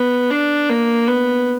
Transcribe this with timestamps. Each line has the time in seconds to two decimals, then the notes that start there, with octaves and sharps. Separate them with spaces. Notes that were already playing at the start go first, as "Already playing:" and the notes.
Already playing: B3
0.31 D4
0.69 A#3
1.07 B3